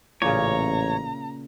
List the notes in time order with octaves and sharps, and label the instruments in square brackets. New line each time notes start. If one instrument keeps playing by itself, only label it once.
[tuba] A1 [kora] A#2 C#3 [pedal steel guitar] C#5 [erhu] A#5